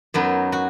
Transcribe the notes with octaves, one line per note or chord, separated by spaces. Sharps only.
F#2 F#3 B3 D#4
F#4